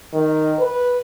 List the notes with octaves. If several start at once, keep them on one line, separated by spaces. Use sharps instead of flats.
D#3
B4